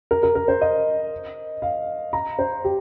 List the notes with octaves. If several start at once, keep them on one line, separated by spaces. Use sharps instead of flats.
A#4
A#4
A#4
C5
D#5
F5
A#5
C5
G4